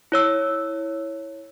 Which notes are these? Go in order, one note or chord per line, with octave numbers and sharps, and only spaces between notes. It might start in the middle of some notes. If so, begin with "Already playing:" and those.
E4 C#5 E6